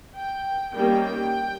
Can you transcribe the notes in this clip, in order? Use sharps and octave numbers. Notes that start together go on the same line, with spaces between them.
G5
D#3 G3 A#3 C#4 G5